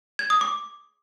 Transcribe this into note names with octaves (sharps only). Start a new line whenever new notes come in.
G#6
D#6
D6